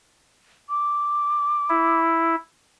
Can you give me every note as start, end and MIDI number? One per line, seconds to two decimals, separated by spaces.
0.69 1.99 86
1.69 2.36 64